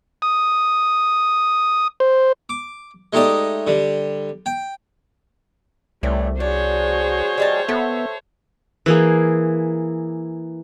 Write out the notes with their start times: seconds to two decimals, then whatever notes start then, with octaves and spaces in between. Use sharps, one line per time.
0.22 D#6
2.00 C5
2.49 D6
3.13 G#3 A3 D#4 G4 D5 D#5
3.67 D3 G3
4.46 G5
6.03 C2 A2 E3 G3 A3 D4
6.40 D4 F#4 G#4 C5 C#5
7.38 G3 D#4 A5
7.69 B3 A4 E5
8.86 E3 A#3 G#4